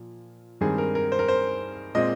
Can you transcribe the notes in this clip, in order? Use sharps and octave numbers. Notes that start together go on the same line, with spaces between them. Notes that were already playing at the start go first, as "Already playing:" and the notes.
Already playing: A#2 F3
G2 D#3 G#3 C4 G#4
A#4
A#4
C5
A#4
C5
A#2 G#3 C4 D#5